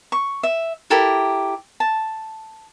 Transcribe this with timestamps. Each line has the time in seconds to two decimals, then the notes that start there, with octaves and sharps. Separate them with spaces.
0.12 C#6
0.43 E5
0.90 E4 G4 A4 A#4
1.80 A5